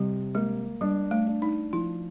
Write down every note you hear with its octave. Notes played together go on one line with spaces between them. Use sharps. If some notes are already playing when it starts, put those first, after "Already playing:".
Already playing: C3 G3
G#3 A#3
G3 D4
A3
D4
D#4
F3 E4